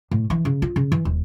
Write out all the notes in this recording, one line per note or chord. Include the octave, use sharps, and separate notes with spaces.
A2
E3
C#3
F4
C#3
E3
D#1